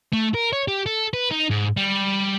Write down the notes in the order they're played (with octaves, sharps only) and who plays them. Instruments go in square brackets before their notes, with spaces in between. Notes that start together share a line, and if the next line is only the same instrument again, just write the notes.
[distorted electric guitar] A3
A#4
C#5
G4
A4
B4
D#4
G#2
G3